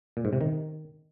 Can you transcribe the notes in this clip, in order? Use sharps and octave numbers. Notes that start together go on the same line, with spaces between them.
A#2
G#2
C3
D#3